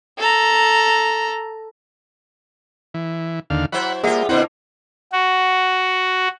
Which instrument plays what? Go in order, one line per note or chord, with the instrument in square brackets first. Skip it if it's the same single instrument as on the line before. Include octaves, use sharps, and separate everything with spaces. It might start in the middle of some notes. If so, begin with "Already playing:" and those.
[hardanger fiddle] A4 A#5
[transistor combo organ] E3
D#2 D3 F5
[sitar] F#3 E4 C5 [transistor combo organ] F#5 B5
[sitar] G3 F4 [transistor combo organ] A#3 [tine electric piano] G#4 E5 F#5
[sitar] A#2 D3 A#3 [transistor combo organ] C4 F#5 [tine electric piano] E4 C5
[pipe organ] F#4